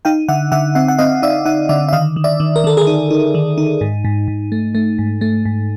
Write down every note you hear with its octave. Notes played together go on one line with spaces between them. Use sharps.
D#4 F5 G5
D3 E5 F#5
D3 E5 F#5
C4 E5 F#5
F#5
C4 D#5 F5
D#4 D5 E5
D#4 E5 F#5
D3 D5 E5
E5
D#3 D#5 F5
D#3
D5 E5
D#3
A#4
D#3 A4
G#4 A#4
D#4
D#4
D#3
D#4
G#2
G#2
G#2
A3
A3
G#2
A3
G#2